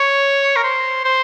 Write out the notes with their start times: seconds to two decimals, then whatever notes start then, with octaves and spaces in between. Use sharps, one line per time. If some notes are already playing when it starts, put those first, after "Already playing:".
Already playing: C#5
0.57 A#4
0.63 C5
1.05 C5